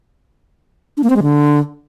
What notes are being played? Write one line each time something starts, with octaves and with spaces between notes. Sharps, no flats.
D4
A#3
C4
G#3
D3